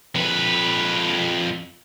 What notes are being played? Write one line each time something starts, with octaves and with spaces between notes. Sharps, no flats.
F2 B4